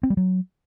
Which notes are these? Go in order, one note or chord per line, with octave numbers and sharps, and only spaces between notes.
C4
G3
F#3